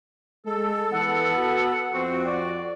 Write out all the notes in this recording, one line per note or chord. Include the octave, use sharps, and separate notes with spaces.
G#3 A4
E3 B3 F#5
F#4
F2 C4 F#4
D5